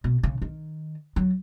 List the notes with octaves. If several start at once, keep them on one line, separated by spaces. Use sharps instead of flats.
B2
C#3
D#3
F#3